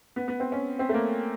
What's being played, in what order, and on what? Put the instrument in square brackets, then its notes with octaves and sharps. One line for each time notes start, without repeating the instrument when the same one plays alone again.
[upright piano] B3
B3
C4
C#4
C4
A3
A#3